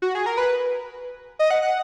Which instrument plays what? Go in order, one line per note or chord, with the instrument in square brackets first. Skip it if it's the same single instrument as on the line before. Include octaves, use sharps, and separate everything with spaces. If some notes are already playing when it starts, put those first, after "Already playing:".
[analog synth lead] F#4
G#4
A#4
B4
D#5
F#5
F#5